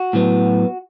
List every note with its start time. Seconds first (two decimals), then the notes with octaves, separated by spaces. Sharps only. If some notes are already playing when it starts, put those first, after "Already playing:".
Already playing: F#4
0.13 A2 F#3 B3